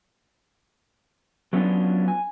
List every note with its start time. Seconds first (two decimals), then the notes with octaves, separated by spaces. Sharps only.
1.53 F#3 A3 B3 C#4 D4 F4
2.08 G#5